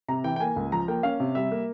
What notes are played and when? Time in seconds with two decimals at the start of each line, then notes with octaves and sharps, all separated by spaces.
0.08 C3 A#5
0.24 E3 G5
0.36 G5
0.40 A#3 G#5
0.56 C#2
0.72 F3 A#5
0.88 A#3 G5
1.03 C#4 F5
1.20 C3
1.35 G3 E5
1.52 A#3